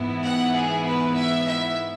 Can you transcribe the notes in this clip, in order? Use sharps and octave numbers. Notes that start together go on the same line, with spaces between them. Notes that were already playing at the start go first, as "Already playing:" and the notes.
Already playing: G#2 E3 B3 E4
F#5
G#4
B4
E5
E5